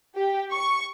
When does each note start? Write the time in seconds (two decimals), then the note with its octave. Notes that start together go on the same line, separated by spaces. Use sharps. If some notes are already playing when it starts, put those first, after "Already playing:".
0.15 G4
0.53 C#6